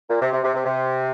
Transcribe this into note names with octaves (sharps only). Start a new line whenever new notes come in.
A#2
C3
C3
C3
C3
C3